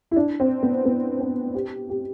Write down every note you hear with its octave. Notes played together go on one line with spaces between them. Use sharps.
E4
D4
C4
B3
B3
C4
G4
G4